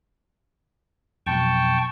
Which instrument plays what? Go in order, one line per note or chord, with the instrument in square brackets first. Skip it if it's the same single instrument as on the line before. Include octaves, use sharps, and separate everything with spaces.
[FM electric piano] F2 B2 F#3 [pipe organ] G5 A5 C#6